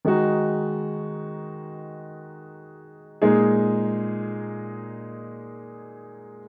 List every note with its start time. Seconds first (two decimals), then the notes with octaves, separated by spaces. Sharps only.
0.05 D#3 G#3 D#4 F#4
3.22 A#2 G#3 D#4 G#4